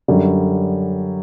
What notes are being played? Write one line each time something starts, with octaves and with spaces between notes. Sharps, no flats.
F#2 D3 G3